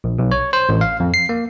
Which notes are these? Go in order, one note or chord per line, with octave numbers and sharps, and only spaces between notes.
A#1
B1
C#5
C5
A1
F5
F2
C7
A#3